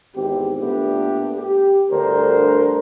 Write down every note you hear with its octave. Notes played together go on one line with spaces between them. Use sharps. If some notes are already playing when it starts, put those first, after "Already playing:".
G#1 E2 C4 G4
A#2 A3 B3 D4 G4
G4
D2 G2 D4 A#4 C5